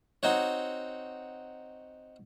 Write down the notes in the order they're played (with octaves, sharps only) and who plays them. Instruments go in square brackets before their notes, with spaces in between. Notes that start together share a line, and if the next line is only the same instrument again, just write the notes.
[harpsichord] C4 D#4 F#4 C#5